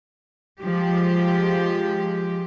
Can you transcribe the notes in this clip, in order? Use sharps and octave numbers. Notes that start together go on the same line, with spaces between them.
F3 G#3 G4